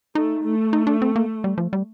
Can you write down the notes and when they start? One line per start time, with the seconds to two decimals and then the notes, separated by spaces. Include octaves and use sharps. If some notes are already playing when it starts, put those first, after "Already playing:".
0.15 A3 D#4
0.44 A3
0.73 D#4
0.87 D4
1.02 C4
1.16 A#3
1.44 G3
1.58 F3
1.73 G3